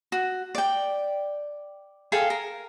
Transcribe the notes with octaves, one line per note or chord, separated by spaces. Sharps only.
F#4
D5 G5
G#4 A4 F5 G5
A#4